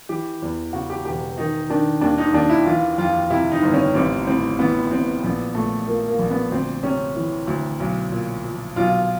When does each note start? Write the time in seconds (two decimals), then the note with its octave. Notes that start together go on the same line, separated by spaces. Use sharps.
0.09 E3 G4
0.42 E2
0.73 C#3 F#4
0.90 G4
1.05 E1 G4
1.38 D#3 D#4
1.70 D#3 D4
2.01 D#2 D4
2.18 D#4
2.34 D#2 D4
2.50 E4
2.66 E3 F4
2.98 F2 F4
3.30 C3 E4
3.52 D#4
3.62 G1
3.74 C#4
3.95 A1 C4
4.27 A2 C4
4.59 E3 B3
4.90 A1 C4
5.23 A#1 B3
5.55 A#2 A3
5.87 F3 A#3
6.08 A#3
6.19 A#1
6.30 B3
6.51 D2 C4
6.83 C3 C#4
7.16 E3
7.47 D2
7.80 B1
8.12 A#2
8.44 F3
8.76 B1 F4